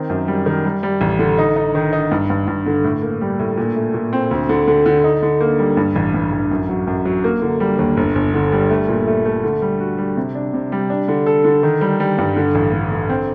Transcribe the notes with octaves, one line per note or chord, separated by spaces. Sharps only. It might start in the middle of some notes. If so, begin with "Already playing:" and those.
Already playing: D#3 C4
F#2
G3
D#3
G3
G3
A1
D3
D#4
D#4
D#3
D#4
G2
G2
G2
D3
A2
A#3
G3
A2
A#2
A3
A#2
C4
D2
D3
D3
D3
D#4
D3
A#3
G3
G2
A1
G2
A1
F#2
F#3
F#2
F#3
A#3
D3
G3
D#2
G1
G1
D3
G3
A3
A#2
A3
A3
D3
G3
F#4
G3
C3
D4
C3
G3
D4
D3
A4
D3
D#3
G3
G3
G2
D3
A1
D3
D3
C4